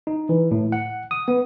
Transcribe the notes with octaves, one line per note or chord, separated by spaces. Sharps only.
D#4
E3
A2
F#5
D#6
B3